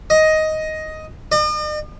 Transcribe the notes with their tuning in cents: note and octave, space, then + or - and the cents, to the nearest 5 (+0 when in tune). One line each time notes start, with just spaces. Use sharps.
D#5 +10
D#5 -45